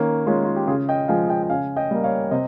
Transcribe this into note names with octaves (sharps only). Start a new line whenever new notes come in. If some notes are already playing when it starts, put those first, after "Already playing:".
Already playing: D#3 A#3 C#4
G#3 C#4 F4
F4
G4
C#3 F4 G#4
D#5 G5
F3 G#3 F5 G#5
D#5 G5
G5
C#3 F5 G#5
D#5 G5
G3 A#3
C#5 F5
C3 C5 D#5